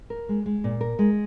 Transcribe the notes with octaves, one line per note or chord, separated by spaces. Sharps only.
A#4
G#3
G#3
A#2
A#4
G#3